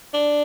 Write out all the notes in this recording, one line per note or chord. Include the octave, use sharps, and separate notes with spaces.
D4